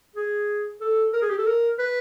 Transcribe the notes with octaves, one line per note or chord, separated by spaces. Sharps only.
G#4
A4
A#4
G#4
G4
A4
A#4
B4